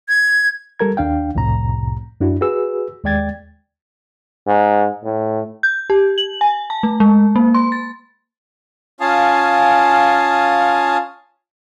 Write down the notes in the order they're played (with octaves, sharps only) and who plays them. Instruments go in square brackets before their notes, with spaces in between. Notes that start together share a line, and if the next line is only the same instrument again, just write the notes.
[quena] G#6
[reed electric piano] G3 A4 A#4 A#5 G#6
D#2 D4 F5 G5
C2 F2 A2 C3 A#5
F#2 D4 E4 F#4
F#4 G#4 B4 E6
D#2 G#3 D5 G5 G#6 A6
[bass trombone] G#2
A2
[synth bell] G6
G4
F#7
G#5
A5
A3
G#3
A#3
C6
A6
[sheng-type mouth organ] C#4 F4 F5 G#5 A5 D#6